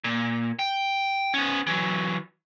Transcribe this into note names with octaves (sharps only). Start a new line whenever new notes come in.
A#2
G5
B3 C#4
E3 F#3